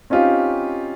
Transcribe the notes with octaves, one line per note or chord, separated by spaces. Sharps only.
C4 C#4 D#4 F4 G4